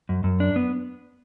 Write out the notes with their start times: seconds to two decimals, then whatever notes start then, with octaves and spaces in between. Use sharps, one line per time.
0.09 F#2
0.24 F#2
0.40 D4
0.56 B3